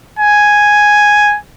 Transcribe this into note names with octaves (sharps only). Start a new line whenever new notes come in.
G#5